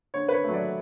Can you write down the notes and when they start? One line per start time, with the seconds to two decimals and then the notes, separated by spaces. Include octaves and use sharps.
0.14 D3 C#5
0.28 B4
0.34 C#5
0.44 F#3 A3
0.54 D5